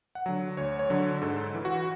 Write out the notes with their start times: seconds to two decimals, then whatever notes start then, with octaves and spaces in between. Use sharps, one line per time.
0.15 F#5
0.26 D3 F#3
0.57 D2 C#5
0.79 C#5
0.90 D3 F#3
1.22 G#2 A4
1.55 E3
1.65 F#4